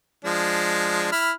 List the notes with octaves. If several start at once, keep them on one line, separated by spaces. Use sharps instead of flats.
F3 G#3 D4
E4 B5 F6